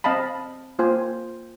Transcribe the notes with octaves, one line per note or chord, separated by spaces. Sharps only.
C4 D#5 F5 A5 B5
A#3 F4 C5 G#5